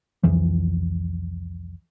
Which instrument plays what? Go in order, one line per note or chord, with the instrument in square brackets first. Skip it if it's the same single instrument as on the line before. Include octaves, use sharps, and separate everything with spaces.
[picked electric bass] C2 F2 E3 F3